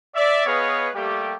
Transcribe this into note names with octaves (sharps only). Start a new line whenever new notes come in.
D5 E5
B3 G#4 B4 C#5 D#5 F5
G3 A3 A#3 G4